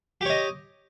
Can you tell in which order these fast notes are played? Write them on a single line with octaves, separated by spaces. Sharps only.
G4 C#5 D#5